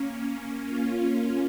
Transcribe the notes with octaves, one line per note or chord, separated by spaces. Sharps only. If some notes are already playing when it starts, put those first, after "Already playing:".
Already playing: A#3 C#4
C#4 F4